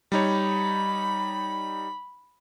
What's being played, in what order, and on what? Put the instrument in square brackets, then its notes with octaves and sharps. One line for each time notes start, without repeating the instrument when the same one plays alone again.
[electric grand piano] G3 D#4 C#5 [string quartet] B5